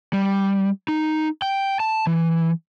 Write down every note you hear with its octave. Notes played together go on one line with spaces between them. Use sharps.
G3
D#4
G5
A5
E3